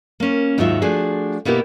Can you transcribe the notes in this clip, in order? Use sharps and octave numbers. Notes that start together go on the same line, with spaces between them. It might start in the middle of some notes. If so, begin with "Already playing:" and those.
A#3 C#4
D#2 G#2 F#3 D#4 F4 E5
F3 A3 D4 F#4 G#4
B2 A#3 B3 E4 G4